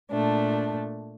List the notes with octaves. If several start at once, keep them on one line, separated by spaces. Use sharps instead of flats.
A#2 A3 D4